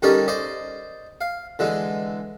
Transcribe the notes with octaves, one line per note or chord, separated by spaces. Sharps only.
D3 G3 C#4 D#4 A#4 D5
C5 D5 D#5
F5
D3 E3 G#3